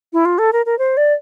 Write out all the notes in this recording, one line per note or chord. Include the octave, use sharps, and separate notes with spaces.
E4
F4
A4
A#4
A#4
C5
D5